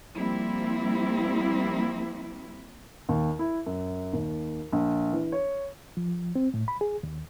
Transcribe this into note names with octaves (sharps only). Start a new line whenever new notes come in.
F3 G3 A#3 C4 E4
D#2
E4
F#2
D#2
A#1
E3
C#5
F3
C4
A2
B5
G#4
D#2